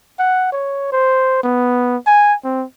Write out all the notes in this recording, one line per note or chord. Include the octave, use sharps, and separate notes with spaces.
F#5
C#5
C5
B3
G#5
C4